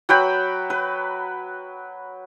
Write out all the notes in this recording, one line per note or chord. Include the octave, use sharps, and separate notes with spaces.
F#3 B4 G5 B5
B4